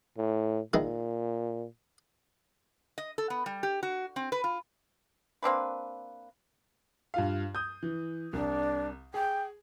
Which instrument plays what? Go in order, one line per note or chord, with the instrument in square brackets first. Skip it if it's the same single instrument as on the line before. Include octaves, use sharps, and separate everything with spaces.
[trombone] A2
[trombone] A#2 [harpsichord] D#3 G#3 E4
[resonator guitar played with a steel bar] D#5
A4
B3
G3
G4
F#4
C4
B4
F4
[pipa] A#3 C4 D4 B4
[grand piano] G2 F4 F5
D#6 G6
E3
[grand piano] C2 [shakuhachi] D4
[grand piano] G#4 [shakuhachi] G5